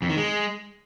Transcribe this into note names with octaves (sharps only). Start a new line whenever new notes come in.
F2
D#3
G#3